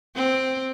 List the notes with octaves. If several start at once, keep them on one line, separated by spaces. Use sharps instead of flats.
C4